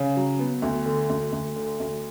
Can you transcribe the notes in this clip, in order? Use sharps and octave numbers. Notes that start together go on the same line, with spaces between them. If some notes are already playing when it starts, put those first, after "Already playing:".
Already playing: C#3
F#3
B3
D2
D3
D2
D2
D3
D2